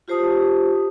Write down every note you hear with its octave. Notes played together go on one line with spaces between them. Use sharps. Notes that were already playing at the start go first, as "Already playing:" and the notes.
F4 G4 C5 A5 D#6